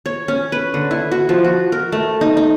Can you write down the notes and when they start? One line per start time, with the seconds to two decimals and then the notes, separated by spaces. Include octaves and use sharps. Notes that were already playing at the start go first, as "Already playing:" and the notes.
0.06 C#5
0.28 C#4
0.52 B4
0.74 D3
0.91 E4
1.11 F#4
1.29 F3
1.44 F#4
1.72 A#4
1.92 A3
2.21 D#4
2.37 D#4